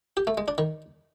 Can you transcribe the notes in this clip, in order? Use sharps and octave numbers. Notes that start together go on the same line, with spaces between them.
G4
A3
G#3
D4
D#3